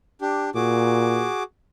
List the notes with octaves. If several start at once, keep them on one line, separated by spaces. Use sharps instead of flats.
D4 G4
A#2 F#4 G#4 D6